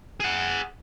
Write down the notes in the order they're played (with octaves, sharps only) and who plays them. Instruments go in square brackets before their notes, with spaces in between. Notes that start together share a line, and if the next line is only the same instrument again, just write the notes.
[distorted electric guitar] G#4 F#5